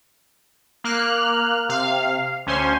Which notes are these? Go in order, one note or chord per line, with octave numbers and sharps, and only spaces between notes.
A#3 F6 F#6
C3 F5
D2 C#4 C5 G#5 C6